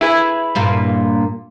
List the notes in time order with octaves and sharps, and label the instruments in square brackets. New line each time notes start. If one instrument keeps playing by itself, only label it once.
[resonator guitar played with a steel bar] E4 G#4 B4
[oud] G2 A#2 A#3